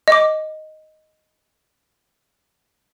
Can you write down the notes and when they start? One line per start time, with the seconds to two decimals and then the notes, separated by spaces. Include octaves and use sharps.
0.08 D#5 D6